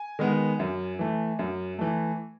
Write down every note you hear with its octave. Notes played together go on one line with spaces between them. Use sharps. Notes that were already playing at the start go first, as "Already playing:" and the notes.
Already playing: G#5
D#3 G#3 B3
F#2
E3 A3
F#2
E3 A3